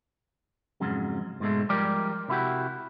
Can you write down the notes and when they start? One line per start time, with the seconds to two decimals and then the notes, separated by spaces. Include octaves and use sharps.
0.80 F2 G#2 C#3 F#3
1.40 G#2 B2 G#3 A3
1.69 F3 G3 G#3 G4 A#4 D5
2.28 C3 E4 F#4 G4